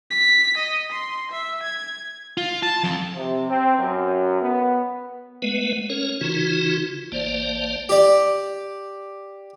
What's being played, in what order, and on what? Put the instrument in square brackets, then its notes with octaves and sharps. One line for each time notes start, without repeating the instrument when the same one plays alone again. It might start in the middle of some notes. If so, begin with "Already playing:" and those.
[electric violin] B6
D#5
C6
E5
G#6
[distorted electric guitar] F4
A5
F2
[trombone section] C3
C4
F#2
B3
[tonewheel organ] G#3 A3 B3 B4
C#4 A#4 C#5
C#3 E3 D#4 F4 F#4
A1 A#3 C5 D5
[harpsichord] G4 D5